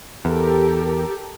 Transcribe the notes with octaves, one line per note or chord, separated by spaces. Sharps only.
E2 G4 A4 A#4